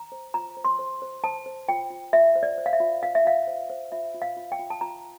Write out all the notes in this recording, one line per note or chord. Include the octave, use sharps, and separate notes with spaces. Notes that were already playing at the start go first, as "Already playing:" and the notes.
Already playing: A#5
C5
F4 A#5
C5
C6
C5
C5
C5 A5
C5
F4 G5
F4
F4 E5
C5
D5
C5
F5
E5
F4
F4 F5
E5
F4 F5
C5
C5
F4 E5
F4
F5
F4
G5
F4
A5
F4 A#5